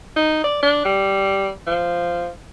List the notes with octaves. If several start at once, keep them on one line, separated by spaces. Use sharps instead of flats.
D#4
D5
D4
G3
F3